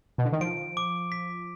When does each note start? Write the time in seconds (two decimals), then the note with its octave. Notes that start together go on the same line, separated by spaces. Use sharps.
0.18 B2
0.25 D3
0.32 D#3
0.41 F3 D7
0.77 D6
1.12 B6